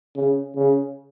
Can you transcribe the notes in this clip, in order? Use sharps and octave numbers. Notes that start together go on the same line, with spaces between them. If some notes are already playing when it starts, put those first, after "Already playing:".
C#3
C#3